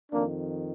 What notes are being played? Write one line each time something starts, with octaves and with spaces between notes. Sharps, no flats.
F2 D#3 A#3 D4